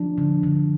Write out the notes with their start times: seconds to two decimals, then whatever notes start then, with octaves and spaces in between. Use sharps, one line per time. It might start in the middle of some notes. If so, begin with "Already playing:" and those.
Already playing: F3 D4
0.18 D3
0.43 D3